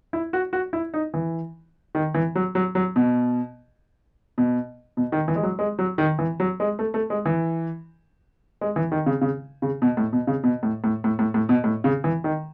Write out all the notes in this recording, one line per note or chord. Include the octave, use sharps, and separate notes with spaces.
E4
F#4
F#4
E4
D#4
E3
D#3
E3
F#3
F#3
F#3
B2
B2
B2
D#3
E3
G#3
F#3
G#3
F#3
D#3
E3
F#3
G#3
A3
A3
G#3
E3
G#3
E3
D#3
C#3
C#3
C#3
B2
A2
B2
C#3
B2
A2
A2
A2
A2
A2
B2
A2
C#3
E3
D#3